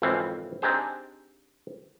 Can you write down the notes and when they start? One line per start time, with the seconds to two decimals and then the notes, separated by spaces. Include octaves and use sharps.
0.02 G#1 F2 C#3 E3 C4 F5
0.62 C4 D4 D#4 G4 G#4 C5